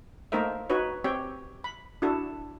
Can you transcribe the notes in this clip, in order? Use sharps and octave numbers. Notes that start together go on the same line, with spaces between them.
A3 A#3 D#4 A#4 C5 E5
D#4 F#4 B4 C#5
C4 G4 C#5 G5
B5
D4 E4 F#4 A4